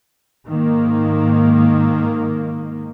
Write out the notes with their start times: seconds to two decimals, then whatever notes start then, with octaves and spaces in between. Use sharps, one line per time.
0.47 G#2 D#3 A#3